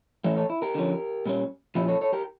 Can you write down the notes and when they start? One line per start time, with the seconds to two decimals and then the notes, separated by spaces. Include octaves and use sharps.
0.24 A2 E3 A3 C#4 C#5 E5
0.37 A4 C#5
0.50 E4
0.62 G4 A#4
0.74 D3 F3 C#4
1.26 A#2 G3 C#4
1.75 A#2 F3 C#4 E4 G4
1.88 A4 C#5
2.01 A4 C#5
2.13 G4 A#4